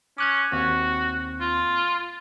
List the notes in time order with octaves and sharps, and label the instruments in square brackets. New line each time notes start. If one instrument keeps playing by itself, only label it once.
[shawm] C#4 [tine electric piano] D6 F#6 G#6
[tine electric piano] D#2 C4 [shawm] F#4
[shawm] F4